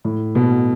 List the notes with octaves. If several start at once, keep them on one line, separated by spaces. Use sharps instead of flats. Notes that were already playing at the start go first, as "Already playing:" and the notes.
A2
B2